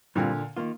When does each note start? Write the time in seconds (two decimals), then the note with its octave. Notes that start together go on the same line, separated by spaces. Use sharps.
0.15 A#2 D3 G3 C4 F4
0.57 D#3 A#3 F4